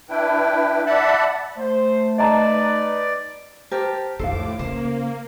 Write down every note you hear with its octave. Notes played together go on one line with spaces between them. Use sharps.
D4 E4 B4 G5
D5 E5 F#5 A5 B5
A3 C5
D#4 B4 D5 D#5 A5 A#5
G4 A#4 C5 A5
F2 A2 D#3 A4 C5 F5 D6
C#3 A#3 C5